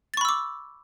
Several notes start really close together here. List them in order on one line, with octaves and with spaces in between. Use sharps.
A6 C#6 B5 E6 D6